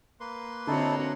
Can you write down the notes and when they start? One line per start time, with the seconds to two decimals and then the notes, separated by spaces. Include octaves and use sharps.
0.20 A#3 B4 C6
0.67 D3 C4 D#4 E4 F#4 A4 C#5